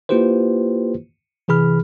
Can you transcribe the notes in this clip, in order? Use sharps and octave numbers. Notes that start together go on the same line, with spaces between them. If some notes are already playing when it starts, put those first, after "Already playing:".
A#3 E4 F4 G4 B4 C5
C3 E3 G#4 B5 F6